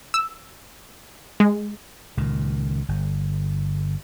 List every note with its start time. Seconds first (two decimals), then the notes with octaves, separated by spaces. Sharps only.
0.14 E6
1.40 G#3
2.17 C#2 A#2 D#3
2.88 G1